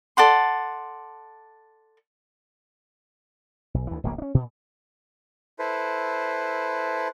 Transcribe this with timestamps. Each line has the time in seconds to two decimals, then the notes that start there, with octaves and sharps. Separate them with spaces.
0.17 A4 D5 F#5 C6
3.74 B1
3.87 D2 E3
4.04 D1 A#1 B2 A#3
4.18 C#4 D4
4.34 A#2
5.59 E4 A4 B4 C5